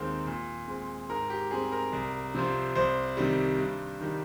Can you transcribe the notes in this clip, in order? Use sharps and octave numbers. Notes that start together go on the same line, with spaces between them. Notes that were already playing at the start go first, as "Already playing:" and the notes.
Already playing: D#2 D#3 G#3 C4
A#2
G#3 C4
G#2 A#4
G4
G3 C4 G#4
A#4
C2
C3 F3 C4
C2 C5
C3 D#3 G3
G2
D#3 G3